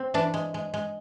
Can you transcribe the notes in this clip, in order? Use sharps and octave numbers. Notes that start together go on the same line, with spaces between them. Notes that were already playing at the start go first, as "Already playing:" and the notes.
Already playing: C4
E3 D4
G#3
G#3
G#3